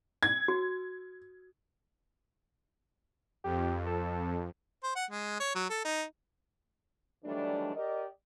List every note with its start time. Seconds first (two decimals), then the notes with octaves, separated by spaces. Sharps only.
0.23 G#6
0.48 F#4
3.44 F2 G4
3.86 A4
4.83 C5
4.96 F#5
5.10 G#3
5.40 C#5
5.55 F#3
5.70 A4
5.85 D#4
7.25 D#3 E3 F#3 G3 A3 D4
7.75 G4 A#4 D5 D#5